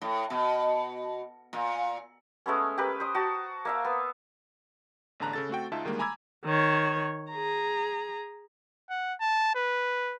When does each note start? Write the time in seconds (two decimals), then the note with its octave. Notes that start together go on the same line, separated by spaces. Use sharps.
0.01 A2
0.30 B2
1.53 A#2
2.46 G#3 A3 B3 C#4
2.78 G4 A#4 B4 B5
3.00 C5 D#6
3.15 F#4 A5
3.65 A#3 E5 F5
3.85 B3
5.20 A1 E2 D3 A5 A#5 F#6
5.33 C#3 A4 A6
5.49 A3 C4 F#4 G5
5.72 C#2 D#4 F4 E5 A5
5.85 D2 D#3 G3 G#3 A#3
5.99 G#5 A#5 B5 D6 E6 G#6
6.45 D#3 C#5
7.31 G#4 A#5
8.90 F#5
9.21 A5
9.55 B4